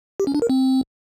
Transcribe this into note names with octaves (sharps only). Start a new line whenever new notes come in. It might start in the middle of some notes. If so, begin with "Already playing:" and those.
G4
C#4
D4
A#4
C4